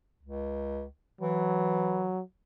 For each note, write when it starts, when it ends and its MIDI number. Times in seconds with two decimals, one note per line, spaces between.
0.23 0.86 37
1.21 2.12 52
1.21 2.21 54